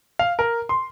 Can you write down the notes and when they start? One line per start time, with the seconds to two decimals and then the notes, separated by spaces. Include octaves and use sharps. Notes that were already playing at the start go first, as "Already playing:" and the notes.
0.19 F5
0.39 A#4
0.69 C6